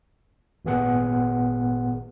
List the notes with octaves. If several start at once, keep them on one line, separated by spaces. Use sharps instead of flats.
G#1 A#2 B3 G#4 F#5